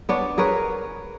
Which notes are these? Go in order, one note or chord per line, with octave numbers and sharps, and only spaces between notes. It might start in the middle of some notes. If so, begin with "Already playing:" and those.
B3 D4 C#5
G#4 A#4 B4 C#5